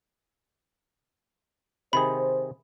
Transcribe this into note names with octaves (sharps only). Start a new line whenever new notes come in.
C3 D#3 G#4 C5 B5